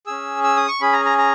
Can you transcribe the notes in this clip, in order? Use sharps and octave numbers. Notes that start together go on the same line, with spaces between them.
C#4 G#4 E6
E6
D#6
C#6
C#4 G#4 B5
A#5
A#5
A#5